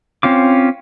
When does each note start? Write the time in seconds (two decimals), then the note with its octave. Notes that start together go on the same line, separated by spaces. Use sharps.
0.23 C4 C#4 F4 D6